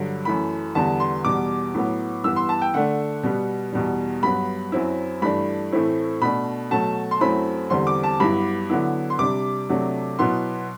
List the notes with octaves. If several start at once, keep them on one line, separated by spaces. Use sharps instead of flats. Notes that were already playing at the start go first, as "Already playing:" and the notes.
Already playing: G2 D3 F#3
F#2 E3 A3 B5
E2 D3 G3 B3 A5
C6
E2 B2 G3 D6
A2 F#3 B3
G2 E3 B3 E6
C6
A5
G5
D3 A3 D4 F#5
B2 G3 B3
E2 B2 G3
G2 F#3 B3 B5
F#2 F#3 C4 E4
G2 E3 A3 D4 B5
A2 E3 A3 C4 E4
B2 A3 D4 B5
B2 F#3 A3 A5
C6
F#2 F#3 A3 C4 E4 B5
E2 D3 G3 C4 C6
D6
A5
G2 F#3 B3 E4 B5
D3 F#3 B3 E4
C6
C3 G3 D4 D6
C3 F#3 A3 D4
B2 F#3 B3 E4 C6